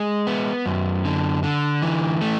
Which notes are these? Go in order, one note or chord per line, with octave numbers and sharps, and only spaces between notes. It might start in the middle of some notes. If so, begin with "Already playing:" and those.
Already playing: G#3
B3
F#2
D3
D3
E3
A3